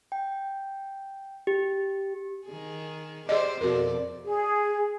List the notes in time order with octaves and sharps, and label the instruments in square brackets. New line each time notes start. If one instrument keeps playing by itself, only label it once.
[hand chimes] G5
G4
[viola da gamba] D#3 G#4
[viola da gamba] G4 C5 [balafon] G#4 D5 D#5
[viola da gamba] F2 B2 D5 [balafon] F#4 A#4
[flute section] G#4